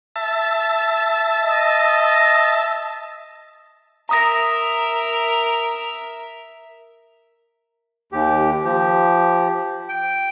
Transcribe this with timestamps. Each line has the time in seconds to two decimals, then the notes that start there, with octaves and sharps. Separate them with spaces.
0.16 E5 A5
1.42 D#5
4.09 A#4 E5 A#5 D#6 A#6
8.12 D#2 G4
8.64 F3 G4
9.89 G5